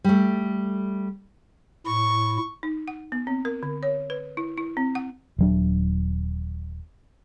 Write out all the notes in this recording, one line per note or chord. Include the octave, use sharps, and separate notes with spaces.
G3 A3
A2 E4 C#6
D#4
F#5
B3
C4
A#4
D3
C#5
B4
E4
E4
C4
F#5
D#1 F#3 D4